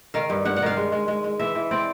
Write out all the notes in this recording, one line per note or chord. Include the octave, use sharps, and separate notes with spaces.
D#3 F5
G2
G2 F#5
F#5
D#3 F5
G#3
G#3
G#3
G#3
E3 E5
E3
C4 D5